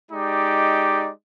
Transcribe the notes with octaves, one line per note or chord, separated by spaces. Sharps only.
G#3 D#4 G4 D5